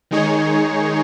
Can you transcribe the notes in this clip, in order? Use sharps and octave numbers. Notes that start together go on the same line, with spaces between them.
D#3 G#3 D#4 G#4 C#5